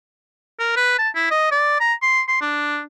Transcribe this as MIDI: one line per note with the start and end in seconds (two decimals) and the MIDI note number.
0.60 0.74 70
0.76 0.96 71
0.99 1.09 81
1.16 1.27 64
1.31 1.50 75
1.52 1.80 74
1.80 1.93 82
2.02 2.21 84
2.28 2.37 84
2.41 2.81 62